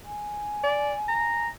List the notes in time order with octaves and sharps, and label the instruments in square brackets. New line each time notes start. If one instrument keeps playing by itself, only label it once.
[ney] G#5
[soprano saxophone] D5
A#5